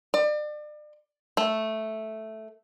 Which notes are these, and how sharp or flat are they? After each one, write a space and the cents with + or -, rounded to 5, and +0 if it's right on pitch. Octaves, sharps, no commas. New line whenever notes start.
D5 +35
A3 -5